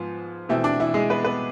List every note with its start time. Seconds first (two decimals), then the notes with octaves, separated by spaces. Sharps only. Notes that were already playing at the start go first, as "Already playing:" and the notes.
Already playing: G#2 F3 B3 F4
0.49 B2 E3 A3 C4 E4
0.64 D4
0.80 E3 E4
0.94 G#3 G#4
1.10 B3 B4
1.24 B3 B4